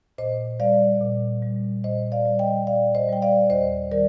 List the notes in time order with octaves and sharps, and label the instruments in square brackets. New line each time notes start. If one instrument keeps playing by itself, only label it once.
[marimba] A#2 C5 D#5
G3 D5 F5
A#2
G3
A#2 C5 D#5
D5 F5
G3
D#5 G5
A#2 D5 F5
C5 D#5
G3 G5
D5 F5
D#2 C5 D#5
D#3 G3 A#4 D5